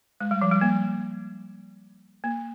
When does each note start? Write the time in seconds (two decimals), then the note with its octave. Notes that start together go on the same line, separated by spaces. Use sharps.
0.20 G#3
0.31 G3
0.41 F3
0.52 G3
0.61 A#3
2.24 A#3